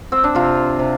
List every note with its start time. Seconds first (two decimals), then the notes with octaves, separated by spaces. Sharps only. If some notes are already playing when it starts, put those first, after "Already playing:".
0.12 C4
0.24 D4
0.35 C3 F4
0.79 C3